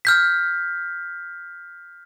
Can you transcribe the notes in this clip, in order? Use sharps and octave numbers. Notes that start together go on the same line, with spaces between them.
F6 G6 B6